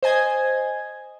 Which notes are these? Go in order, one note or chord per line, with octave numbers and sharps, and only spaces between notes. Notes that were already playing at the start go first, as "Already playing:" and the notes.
C5 D#5 G#5 G#6